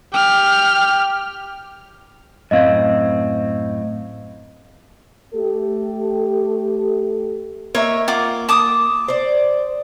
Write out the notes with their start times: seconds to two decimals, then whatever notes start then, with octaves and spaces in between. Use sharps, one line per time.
0.13 G4 G5 F6
2.51 F#2 A2 C4 D#5 F5 G#6
5.34 A3 G4 A4
7.75 A#3 C#5 D#5 E5
8.08 F4 F#5 D6
8.49 A5 D6 D#6
9.08 C5 D5